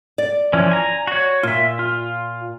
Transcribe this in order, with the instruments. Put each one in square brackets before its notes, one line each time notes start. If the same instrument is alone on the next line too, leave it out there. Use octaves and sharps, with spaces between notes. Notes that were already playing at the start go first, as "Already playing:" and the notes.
[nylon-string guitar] D5
[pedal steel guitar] E3 F3 C#4
G#5 A#5
F#4 C#5
[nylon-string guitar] A#2 [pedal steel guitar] F4 E5
[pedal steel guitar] F4